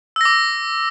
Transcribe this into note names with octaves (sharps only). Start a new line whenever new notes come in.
D6 E6 A#6